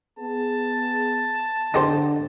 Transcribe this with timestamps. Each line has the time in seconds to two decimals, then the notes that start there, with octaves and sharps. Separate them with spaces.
0.19 B3 G#4 A5
1.74 D3 D#4 G4 C5